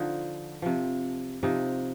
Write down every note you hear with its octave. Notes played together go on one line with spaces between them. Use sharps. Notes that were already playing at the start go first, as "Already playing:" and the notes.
Already playing: D3 F3 D#4
C3 F3
C3 F3 D#4